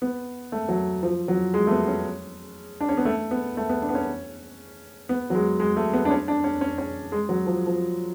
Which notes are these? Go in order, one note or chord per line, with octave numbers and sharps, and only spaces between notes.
B3
A3
F#3
F3
F#3
G#3
A3
B3
C#4
D4
C#4
B3
A3
B3
A3
B3
D4
B3
C#4
B3
F#3
G#3
G#3
A3
B3
D4
C#4
D4
C#4
C#4
C#4
G#3
F#3
F3
F3